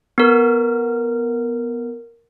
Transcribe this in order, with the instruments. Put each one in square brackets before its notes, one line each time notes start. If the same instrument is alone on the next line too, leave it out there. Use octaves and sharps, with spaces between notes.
[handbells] B3 A#4